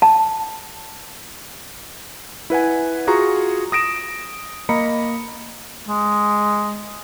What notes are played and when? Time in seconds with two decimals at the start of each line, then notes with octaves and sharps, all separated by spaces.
0.02 A5
2.50 E4 B4 F#5 G#5
3.07 F4 F#4 G#4 A#5 C#6
3.72 D#6 A#6 D7 E7
4.69 A#3 D#5 A#5 B5 C#7
5.88 G#3